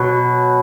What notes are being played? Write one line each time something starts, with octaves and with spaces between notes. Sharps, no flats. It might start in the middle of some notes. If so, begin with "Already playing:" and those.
Already playing: B2 F#3